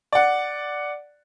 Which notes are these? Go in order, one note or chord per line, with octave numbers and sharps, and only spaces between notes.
D5 F#5